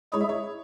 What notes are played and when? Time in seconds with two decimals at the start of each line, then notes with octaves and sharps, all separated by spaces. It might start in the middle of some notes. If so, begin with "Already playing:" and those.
0.13 G#3 E4 G#4 C#5
0.21 E5
0.29 C#5